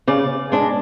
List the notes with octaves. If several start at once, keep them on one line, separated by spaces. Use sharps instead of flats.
C#3 D5
G#3 D4